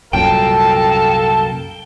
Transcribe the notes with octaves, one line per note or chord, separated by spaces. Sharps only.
C2 F#2 A#2 A4 A#4 F5 G5 A5